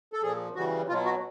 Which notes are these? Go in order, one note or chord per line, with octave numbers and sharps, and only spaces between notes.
A4
A#2 F3 G#4
C#3 E3 G3 F#4
B2 F#3 F4
F#4